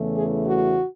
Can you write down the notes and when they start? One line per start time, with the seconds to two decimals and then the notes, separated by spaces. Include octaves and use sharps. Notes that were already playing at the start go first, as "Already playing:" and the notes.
Already playing: E2 C#3 E3 A3
0.16 G#4
0.47 F#4